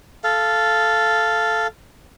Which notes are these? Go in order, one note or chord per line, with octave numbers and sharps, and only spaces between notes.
A4 F5